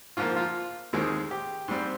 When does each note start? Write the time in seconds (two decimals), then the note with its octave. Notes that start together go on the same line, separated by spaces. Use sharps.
0.17 G#2 F3 A#3 F4
0.37 F4
0.93 D#2 D#3 G#3 C4
1.31 G4
1.68 G#2 G3 C4